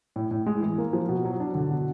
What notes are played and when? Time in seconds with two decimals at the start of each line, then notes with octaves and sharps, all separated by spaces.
0.16 A2
0.31 A2
0.46 G#3
0.62 E3
0.78 A#3
0.93 F3
1.09 B2
1.25 F#3
1.40 D4
1.55 D3
1.70 B2